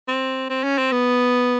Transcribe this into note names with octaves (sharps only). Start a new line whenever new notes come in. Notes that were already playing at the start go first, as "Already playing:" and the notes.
C4
C4
C#4
C4
B3